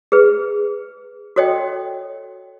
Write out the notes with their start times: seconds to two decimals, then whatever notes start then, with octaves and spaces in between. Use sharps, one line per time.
0.12 G#4 B4
1.36 F#4 A4 C#5 D#5 G5